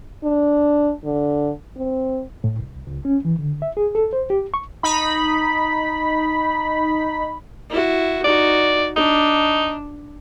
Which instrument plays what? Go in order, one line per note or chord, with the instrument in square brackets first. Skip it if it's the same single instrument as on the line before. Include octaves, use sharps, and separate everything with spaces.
[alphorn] D4
D3
C4
[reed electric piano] A2
C2
C#2
C#4
E3
D3
E5
G#4
A4
C5
G4
C#6
[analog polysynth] D#4 B5
[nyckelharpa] E4 F#4
[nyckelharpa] D#4 F#4 [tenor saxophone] D5
[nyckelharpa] D4 [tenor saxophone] D#4